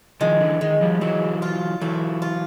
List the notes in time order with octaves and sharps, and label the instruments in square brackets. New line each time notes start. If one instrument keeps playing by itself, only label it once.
[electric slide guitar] D#3 F3 [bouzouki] G#3
[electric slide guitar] D3 E3
[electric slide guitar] D#3 [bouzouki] G#3
[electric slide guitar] F3 G3
[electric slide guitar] E3 F#3 [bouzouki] C4
[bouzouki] F4
[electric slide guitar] E3 F#3 [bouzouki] A3
[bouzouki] F4